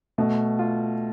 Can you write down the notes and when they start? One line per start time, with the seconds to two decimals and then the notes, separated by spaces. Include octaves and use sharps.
0.18 B2 A3
0.59 F4